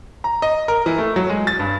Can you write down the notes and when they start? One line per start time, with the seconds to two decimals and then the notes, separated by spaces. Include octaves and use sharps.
0.24 A#5
0.42 D#5
0.68 A#4
0.86 E3
0.98 A3
1.16 F#3
1.30 G#3
1.47 A6
1.59 G2